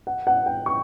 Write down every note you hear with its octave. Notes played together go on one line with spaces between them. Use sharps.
F#5
F#5
G5
C#6